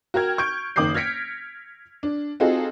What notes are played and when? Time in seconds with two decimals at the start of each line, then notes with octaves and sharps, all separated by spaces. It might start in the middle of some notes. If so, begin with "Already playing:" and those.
0.14 F#4 A#4 G5 F6 G#6
0.38 C#6 G6 D7
0.76 F#1 D#3 D6 D#6 G6 C7
0.94 F6 G#6 A#6 B6 C#7 D7
2.03 D4
2.40 C4 D#4 F4 F#4 G#4 A4